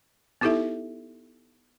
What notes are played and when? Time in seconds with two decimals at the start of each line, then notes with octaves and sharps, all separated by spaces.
0.41 B3 D#4 E4 G4 A4 E5